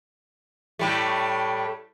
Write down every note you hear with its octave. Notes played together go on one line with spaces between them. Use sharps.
A2 G3 A3